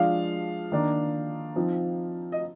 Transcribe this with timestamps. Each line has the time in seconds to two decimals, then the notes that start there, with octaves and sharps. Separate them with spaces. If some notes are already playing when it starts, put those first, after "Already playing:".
Already playing: F3 G#3 D4 F5
0.72 D#3 A#3 D4
1.55 F3 C4 D#4
2.32 D#5